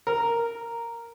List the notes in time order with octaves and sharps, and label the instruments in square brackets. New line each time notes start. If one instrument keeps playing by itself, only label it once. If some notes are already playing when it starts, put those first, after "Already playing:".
[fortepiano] A#4